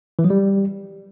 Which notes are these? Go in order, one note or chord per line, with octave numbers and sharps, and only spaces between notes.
E3
F#3
G3